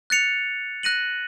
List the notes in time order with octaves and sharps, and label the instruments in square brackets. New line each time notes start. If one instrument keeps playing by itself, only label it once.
[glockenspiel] F#6 A6 C#7 F7
F#6 A#6 D#7 F#7